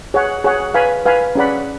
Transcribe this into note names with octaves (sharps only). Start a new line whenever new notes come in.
G#4 C#5 F#5
G#4 C#5 F#5
B4 F5 G#5 B5
B4 F5 G#5 B5
C#4 G#4 D5 F#5 B5